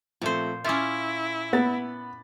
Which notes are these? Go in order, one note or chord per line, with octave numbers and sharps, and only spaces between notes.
A#2 F3 A3 C4 C5
C#4 E4 F4 E5 D6
B3 B5 A6